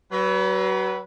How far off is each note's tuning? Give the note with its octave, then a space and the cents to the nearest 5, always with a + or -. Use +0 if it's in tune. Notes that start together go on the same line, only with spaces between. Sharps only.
F#3 +35 B4 -10